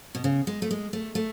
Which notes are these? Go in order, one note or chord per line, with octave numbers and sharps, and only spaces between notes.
B2
C#3
G#3
A3
G#3
A3
A3